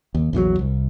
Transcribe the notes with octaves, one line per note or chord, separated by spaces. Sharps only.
D#2
A#1 E2 E3 F#3
C2